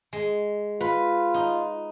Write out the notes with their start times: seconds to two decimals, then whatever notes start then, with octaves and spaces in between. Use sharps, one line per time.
0.13 G#3
0.81 F4 B4
1.34 D#4